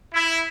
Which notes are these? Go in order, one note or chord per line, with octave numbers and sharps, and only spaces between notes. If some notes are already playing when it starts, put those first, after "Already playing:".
E4